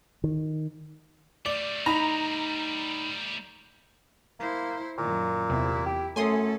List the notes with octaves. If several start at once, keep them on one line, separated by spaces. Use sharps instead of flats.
D#3
G3 A3 D5
D#4 A#5 B5
A#3 E4 C5
F#2 A#2 D#3
E2 C3 E4
G4
F#2 A3 C#4 A4 G#5 C6 D#6